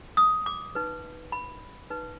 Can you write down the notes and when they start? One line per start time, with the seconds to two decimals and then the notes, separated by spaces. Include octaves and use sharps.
0.17 D#6
0.46 D6
0.75 D#4 B4
1.32 B5
1.90 D#4 B4